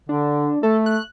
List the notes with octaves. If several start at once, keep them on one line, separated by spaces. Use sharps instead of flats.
D3 D4
A3 A4
F#6